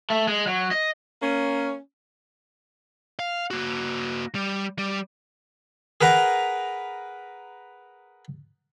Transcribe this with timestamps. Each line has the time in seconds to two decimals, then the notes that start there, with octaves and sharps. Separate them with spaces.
0.10 A3
0.28 G#3
0.47 F#3
0.71 D#5
1.22 A#3 C#4
3.19 F5
3.51 A#3 F#4
4.35 G3
4.79 G3
6.01 G#4 A#4 B4 F#5 A#5